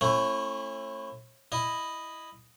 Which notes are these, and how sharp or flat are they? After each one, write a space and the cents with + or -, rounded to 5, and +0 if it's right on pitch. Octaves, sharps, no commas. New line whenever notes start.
A3 +15 C#4 -35 E4 +15
E4 +0 D#5 +0